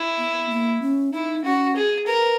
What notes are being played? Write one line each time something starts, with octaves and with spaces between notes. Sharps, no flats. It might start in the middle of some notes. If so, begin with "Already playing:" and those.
Already playing: E4
B3
A#3
C#4
D#4 E4
C#4 F#4
G#4
A#4 B4